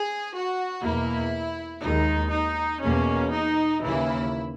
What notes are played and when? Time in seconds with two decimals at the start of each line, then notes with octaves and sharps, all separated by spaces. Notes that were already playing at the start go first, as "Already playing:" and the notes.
Already playing: G#4
0.34 F#4
0.84 E2 B2 A#3 E4
1.84 D#2 D#3 G#3 D#4
2.34 D#4
2.84 E2 B2 A#3 C#4
3.34 D#4
3.84 D#2 C#3 E3 A#3 E4